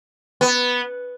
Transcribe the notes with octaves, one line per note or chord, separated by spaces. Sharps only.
B3